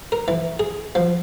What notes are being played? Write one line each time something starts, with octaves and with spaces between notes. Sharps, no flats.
A#4
E3
G#4
F3